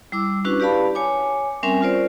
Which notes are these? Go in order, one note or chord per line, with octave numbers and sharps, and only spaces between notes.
G3 E4 D6 E6
C#4 D4 E4 F#4 B4 C#6
G4 B4 D5 F5 A5 B5
C#5 G#5 D6
G3 C4 C#4 A#4 E5 G#5
C#4 F4 A#4 C5 D5